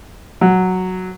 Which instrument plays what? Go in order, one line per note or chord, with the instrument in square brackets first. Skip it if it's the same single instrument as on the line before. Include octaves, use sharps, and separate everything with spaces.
[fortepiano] F#3